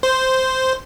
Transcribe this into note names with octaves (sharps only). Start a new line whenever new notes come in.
C5